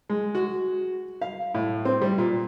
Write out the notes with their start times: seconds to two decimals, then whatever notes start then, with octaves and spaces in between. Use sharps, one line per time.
0.10 G#3
0.35 F#4
1.22 F5
1.54 A2
1.85 C4
2.02 G3
2.18 A#2